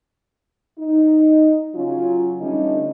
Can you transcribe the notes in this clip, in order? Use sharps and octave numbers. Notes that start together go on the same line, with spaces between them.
D#4
C#3 F#3 C#4 F4
D3 E3 G3 A3 C#4 D#4